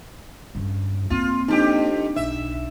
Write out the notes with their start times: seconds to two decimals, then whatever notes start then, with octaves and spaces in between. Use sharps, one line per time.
0.55 G2 C#3
1.10 A#3 C4 F4
1.48 F2 D4 D#4 G4
2.16 B1 E5